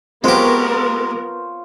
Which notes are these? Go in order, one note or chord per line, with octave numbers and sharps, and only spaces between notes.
G#3 B3 C4 F4 G4 A#4 C5 C#5